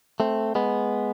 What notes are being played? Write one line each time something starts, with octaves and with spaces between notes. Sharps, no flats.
A3 C4
G#3 B3